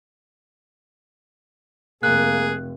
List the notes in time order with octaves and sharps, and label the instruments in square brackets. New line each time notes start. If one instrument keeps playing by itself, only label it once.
[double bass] F1 [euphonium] A#3 [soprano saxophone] G#4 [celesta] F#6